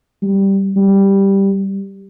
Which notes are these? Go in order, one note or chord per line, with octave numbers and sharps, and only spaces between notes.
G3
G3